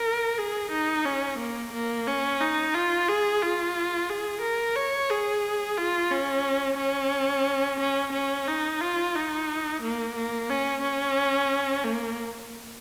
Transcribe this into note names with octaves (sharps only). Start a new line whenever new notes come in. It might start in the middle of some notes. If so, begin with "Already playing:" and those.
Already playing: A#4
G#4
D#4
C#4
A#3
A#3
C#4
D#4
F4
G#4
F4
G#4
A#4
C#5
G#4
F4
C#4
C#4
C#4
C#4
D#4
F4
D#4
A#3
A#3
C#4
C#4
A#3